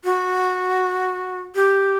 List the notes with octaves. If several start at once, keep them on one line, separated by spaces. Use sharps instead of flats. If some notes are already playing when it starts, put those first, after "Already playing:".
F#4
G4